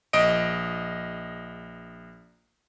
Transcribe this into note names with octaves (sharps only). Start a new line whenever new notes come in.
A#1 D#5 D7